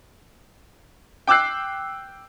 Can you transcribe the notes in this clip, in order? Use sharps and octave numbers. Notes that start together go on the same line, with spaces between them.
G5 D6 E6 F#6 C7